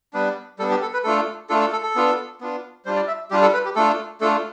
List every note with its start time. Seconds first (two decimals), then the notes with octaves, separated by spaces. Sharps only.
0.13 G3 B3 D4 B4
0.59 G3 B3 D4 A4
0.71 G4
0.82 A4
0.93 B4
1.04 A3 D4 F4 A4
1.49 A3 D4 F4 A4
1.61 A4
1.72 A4
1.83 A4
1.96 B3 D4 F4
2.41 B3 D4 F4
2.85 G3 D4 F4 C5
2.96 D5
3.07 E5
3.31 G3 D4 F4 G4
3.42 A4
3.54 B4
3.65 G4
3.75 A3 D4 F4 A4
4.21 A3 D4 F4 A4